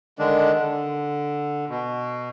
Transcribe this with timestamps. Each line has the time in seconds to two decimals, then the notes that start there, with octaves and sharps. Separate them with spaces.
0.19 D3 D#3 G#3 D4
0.53 D3
1.69 B2